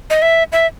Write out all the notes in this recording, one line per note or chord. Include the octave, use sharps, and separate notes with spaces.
D#5
E5
E5